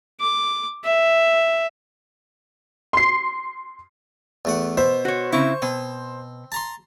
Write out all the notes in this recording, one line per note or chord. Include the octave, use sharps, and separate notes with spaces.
D6
E5
C6 C7
E2 A3 F#5
B2 C5 E5
F#4 C#5
C#3 C4 E4 C#6
B2 C4
A5 A#5 C6